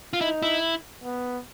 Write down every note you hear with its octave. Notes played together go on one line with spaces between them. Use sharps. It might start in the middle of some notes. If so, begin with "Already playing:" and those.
F4
D#4 E4
E4
B3